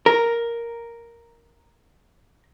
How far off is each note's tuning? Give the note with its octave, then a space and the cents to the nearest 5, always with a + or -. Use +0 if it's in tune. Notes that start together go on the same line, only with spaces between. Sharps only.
A#4 +0